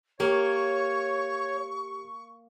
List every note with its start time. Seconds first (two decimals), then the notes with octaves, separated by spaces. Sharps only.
0.20 A#3 G4 C#5 C#6